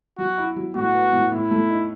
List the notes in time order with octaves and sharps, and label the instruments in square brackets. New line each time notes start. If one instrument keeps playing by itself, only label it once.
[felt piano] F#3 [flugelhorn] F#4
[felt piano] E4
F#3
[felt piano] A2 [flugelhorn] F#4
[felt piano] B3
A2
[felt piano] A2 [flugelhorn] E4
[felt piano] A3
D#4